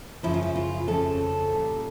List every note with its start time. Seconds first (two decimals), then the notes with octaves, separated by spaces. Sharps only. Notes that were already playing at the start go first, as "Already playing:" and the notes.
0.23 F#2 C#3 F3 E4
0.34 F4
0.43 E4
0.56 F4
0.87 F2 C#3 F3 A4
1.51 A#2 G3